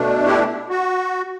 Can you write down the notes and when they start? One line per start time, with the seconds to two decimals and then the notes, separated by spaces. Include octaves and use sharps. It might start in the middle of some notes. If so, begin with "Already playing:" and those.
Already playing: B2 A3 D4
0.26 E4 G4
0.70 F#4